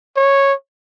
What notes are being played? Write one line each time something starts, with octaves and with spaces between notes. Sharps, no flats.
C#5